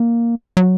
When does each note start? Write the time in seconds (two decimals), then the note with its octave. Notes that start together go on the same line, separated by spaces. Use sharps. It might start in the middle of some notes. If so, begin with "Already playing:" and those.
Already playing: A#3
0.57 F#3